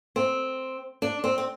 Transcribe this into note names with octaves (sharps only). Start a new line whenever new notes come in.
C4
D4
C4
C4